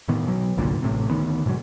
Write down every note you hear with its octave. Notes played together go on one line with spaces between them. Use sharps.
A2 D#3 B3
B2 F#3
G1 C2 A#2 D3
A1 A2 C3
D2 D#3 B3
G#2 B2 D3 F#3